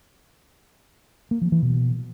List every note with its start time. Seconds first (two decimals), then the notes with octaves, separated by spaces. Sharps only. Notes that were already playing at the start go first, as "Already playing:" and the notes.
1.31 A#3
1.42 F3
1.52 E3
1.62 B2